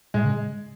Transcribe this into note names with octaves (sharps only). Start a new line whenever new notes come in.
A2 G#3
C#3